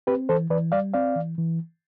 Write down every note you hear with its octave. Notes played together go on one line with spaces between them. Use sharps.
C4 G4 B4
E3 A4 C5
E3 B4 D5
G3 D5 F5
C4 D5 F5
E3
E3